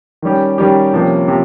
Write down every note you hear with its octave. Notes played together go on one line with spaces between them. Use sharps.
D#3 G3 C#4 G4
D#3 G3 C#4 G4
C3 F3 A#3 C#4
C3 F3